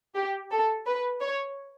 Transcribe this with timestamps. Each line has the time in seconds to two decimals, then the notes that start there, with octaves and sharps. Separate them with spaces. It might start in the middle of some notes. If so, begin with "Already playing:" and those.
0.16 G4
0.51 A4
0.87 B4
1.21 C#5